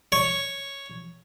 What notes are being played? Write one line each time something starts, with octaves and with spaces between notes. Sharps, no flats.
C#5